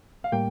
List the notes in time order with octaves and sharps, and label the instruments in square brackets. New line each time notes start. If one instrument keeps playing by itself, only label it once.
[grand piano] F5
[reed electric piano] A2 G3 A#3 [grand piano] G5